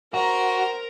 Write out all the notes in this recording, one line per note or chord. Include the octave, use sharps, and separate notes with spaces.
F#4 A#4 C5 A#5